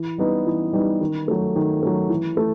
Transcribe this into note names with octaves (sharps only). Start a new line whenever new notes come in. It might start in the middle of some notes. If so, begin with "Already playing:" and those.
Already playing: E3
G3 B3 D#4
E3
G3 B3 D#4
D#3
F#3 A3
D#3
F#3 A3
E3
A3